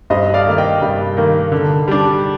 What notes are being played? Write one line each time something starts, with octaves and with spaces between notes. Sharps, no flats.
G2 C5 D#5
D5 F5
D#3 A#3
D#5 G5
G2
D#3 A#3
D3
G3 D4